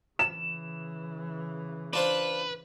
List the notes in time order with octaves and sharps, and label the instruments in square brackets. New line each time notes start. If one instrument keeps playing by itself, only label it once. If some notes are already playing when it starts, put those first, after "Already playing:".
[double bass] C#3 E3 [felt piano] E7
[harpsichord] D4 F4 C5 [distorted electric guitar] B4